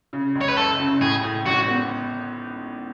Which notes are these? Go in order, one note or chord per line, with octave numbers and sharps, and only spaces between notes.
C#3
C#2
C#5
B4
F#1 A4
C#3
A2 G#4
A2
G#1 F#4
B3